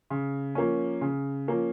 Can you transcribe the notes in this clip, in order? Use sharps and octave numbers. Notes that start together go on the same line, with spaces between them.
C#3
F3 A#3 C#4
C#3
F3 A#3 C#4